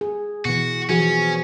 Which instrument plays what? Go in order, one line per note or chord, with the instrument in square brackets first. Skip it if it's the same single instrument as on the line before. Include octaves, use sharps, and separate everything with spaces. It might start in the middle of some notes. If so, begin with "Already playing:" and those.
[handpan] G#4
[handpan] B2 E3 [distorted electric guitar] F#4
[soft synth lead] E3 [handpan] F3 F#4 G#4 [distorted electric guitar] C#4